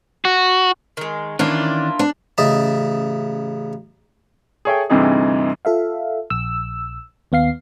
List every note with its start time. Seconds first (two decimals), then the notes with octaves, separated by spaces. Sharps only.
0.25 F#4
0.97 D#3 G#3
1.39 D#3 E3 A#3 C#4 D4 E4 F4
1.99 D4
2.38 A1 C#3 D#5 E5 A5
4.65 G#4 A4 C#5 E5 G5
4.90 D2 G2 C3 E3 D#4 G#4
5.65 F4 A4 E5 F5
6.30 A#1 E6
7.32 D#2 B3 F5 C7